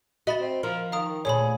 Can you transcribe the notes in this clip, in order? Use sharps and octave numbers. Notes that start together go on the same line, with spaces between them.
F#4 D#5 E5 B5 A6
C4
F3 A#4
D#3 F5 A#5 D#6
D2 A#2 G#4 C#5 B5